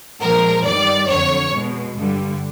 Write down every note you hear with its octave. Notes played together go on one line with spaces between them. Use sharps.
A#2 F3 G#3 A#4
G2 D#3 G3 D5
F2 D3 F#3 C#5
B2 G#3
G2 D3 G3